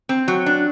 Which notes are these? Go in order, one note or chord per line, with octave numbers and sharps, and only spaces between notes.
C4
F#3
D4